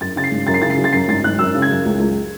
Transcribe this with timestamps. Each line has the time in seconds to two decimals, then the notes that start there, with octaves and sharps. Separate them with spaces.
0.01 F#2 A6
0.16 C#3 A6
0.24 C7
0.31 G#1
0.47 F#2 A6
0.54 C7
0.62 C#3 A6
0.70 C7
0.78 F#3
0.84 A6
0.92 F#2 C7
1.08 G#1 A6
1.24 G#1 F#6
1.39 F#2 E6
1.55 C#3
1.62 G#6
1.70 F#2
1.86 C#2
2.00 C#2